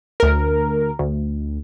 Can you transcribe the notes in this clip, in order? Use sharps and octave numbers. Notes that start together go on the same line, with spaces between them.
D2 A#4
D2